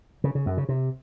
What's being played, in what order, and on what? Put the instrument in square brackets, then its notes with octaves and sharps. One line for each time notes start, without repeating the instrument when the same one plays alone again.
[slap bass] C#3
C#3
F#2
C#3
C3